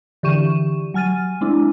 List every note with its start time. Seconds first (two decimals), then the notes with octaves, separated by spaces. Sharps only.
0.23 D3 E3 G4 C#6 D#7 E7
0.94 F#3 G#5 F6 A6 D#7
1.41 G#3 C4 D4 E4